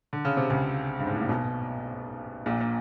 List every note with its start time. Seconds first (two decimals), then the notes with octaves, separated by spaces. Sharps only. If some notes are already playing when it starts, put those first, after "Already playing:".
0.13 D3
0.25 C#3
0.37 C3
0.50 C#2 C#3
0.99 G2
1.07 G#2
1.14 A2
1.21 A#2
1.29 B1 B2
2.46 A#1 A#2
2.61 A#2